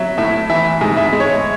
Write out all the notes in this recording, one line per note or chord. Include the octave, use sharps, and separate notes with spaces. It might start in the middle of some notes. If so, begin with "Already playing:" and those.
Already playing: F#3 E5
A2 E5
E3 E5
G#2
E5
G#3
C#5